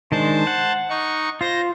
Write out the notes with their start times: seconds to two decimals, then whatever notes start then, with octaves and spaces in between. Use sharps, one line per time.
0.12 D#3 G#3 D4 C5 A5
0.47 F#5
0.90 D#4 C#6
1.41 F4 C5 A#6